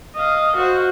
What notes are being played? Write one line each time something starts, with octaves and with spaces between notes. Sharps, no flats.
D#5 F5
F#4 C5